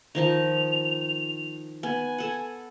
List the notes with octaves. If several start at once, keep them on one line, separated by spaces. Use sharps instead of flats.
D#3 F3 D#4 F7
B3 G#5
A4 F#5